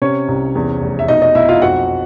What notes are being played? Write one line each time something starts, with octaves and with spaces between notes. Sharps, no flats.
C3 C#4 C#5
C2
E2
F1
E5
B2 D#4 D#5
D#4 D#5
B1 E4 E5
F4 F5
F2 F#4 F#5